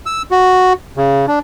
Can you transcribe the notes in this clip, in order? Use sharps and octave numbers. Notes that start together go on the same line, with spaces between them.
E6
F#4
C#3
D4